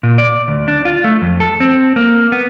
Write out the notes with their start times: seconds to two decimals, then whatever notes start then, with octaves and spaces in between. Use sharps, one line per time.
0.03 A#2
0.18 D5
0.48 D2
0.68 D4
0.85 F4
1.04 A3
1.22 F2
1.40 A4
1.60 C4
1.96 A#3
2.32 B3